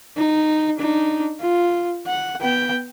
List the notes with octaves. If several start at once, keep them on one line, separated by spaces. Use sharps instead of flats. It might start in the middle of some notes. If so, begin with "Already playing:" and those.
D#4
D4 D#4
F4
F#5
B3 G5